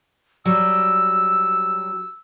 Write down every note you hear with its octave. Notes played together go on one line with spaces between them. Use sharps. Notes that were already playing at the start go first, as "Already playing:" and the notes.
F#3 G3 E6